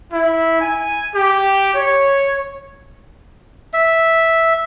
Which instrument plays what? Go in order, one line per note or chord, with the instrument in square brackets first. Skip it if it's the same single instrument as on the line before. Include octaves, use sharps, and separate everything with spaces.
[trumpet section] E4
G#5
G4
C#5
[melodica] E5